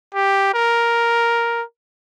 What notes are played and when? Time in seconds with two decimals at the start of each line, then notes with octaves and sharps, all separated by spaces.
0.14 G4
0.55 A#4